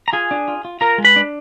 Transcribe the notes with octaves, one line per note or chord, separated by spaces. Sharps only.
A#5
F4 G#4 G#5
D4
F4
F4
F4 A#4 A#5
G#3
B4 B5
D4